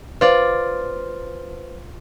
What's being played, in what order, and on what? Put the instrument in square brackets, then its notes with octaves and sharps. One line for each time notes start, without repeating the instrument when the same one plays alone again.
[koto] F4 D5 [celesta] B4 C5